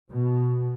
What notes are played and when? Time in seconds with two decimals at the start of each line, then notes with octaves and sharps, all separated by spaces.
0.12 B2